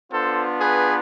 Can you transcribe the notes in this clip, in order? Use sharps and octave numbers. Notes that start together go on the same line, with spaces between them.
B3 D4 F4 A4 C5
G#4 B4